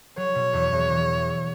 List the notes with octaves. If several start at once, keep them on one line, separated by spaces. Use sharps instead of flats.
F#3 C#5
B2
E2
E2
E3